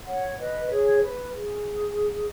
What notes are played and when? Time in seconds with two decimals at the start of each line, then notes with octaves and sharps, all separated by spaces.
0.07 C#5 F#5
0.38 B4 D#5
0.70 G#4 C#5
1.01 B4
1.32 G#4